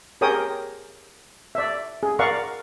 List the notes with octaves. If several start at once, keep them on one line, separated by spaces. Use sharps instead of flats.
G4 G#4 A#4 C#5 G5 D#6
D5 E5
G#4
A#4 D5 F5 F#5 C#6